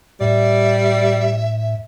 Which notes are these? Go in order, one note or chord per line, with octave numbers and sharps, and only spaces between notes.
A2 G3 D5 E5